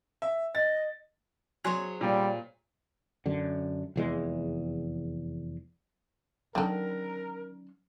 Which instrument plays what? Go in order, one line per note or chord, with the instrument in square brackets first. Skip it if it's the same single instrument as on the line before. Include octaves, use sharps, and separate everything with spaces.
[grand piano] E5
[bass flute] D#5 [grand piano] A6
[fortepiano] F#3 [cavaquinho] G#4 C5 C#5
[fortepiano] A#2 [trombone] G3
[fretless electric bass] F#2 D3
F1 E2 G#3
[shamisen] D3 D#3 [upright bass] F#3 C#4 [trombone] A#4